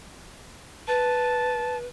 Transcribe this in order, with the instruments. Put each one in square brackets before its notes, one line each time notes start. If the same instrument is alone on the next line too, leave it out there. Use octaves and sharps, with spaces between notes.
[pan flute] B4 [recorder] A5